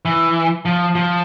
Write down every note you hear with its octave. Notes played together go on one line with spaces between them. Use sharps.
E3
F3
F3